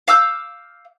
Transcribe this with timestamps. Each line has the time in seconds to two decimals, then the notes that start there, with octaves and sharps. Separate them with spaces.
0.08 F5 D6 E6 G6